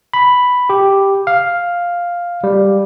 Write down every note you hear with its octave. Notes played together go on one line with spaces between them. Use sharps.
B5
G4
F5
G3